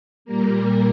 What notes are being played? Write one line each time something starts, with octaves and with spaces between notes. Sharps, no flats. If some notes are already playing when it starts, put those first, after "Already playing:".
A#2 G3 A#3 A#4